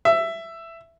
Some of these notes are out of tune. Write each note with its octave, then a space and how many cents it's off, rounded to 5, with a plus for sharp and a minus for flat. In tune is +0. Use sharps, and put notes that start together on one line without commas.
E5 +10